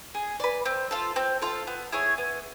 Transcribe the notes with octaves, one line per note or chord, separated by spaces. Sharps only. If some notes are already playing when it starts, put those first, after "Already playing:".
G#4
B4 D5
C4
F4 A4
C4
F4 A4
B3
E4 G#4 C#5
B3